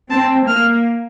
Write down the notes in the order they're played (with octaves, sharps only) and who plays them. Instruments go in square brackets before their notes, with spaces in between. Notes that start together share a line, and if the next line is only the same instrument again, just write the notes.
[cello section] C4 [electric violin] A5
[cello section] A#3 [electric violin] F6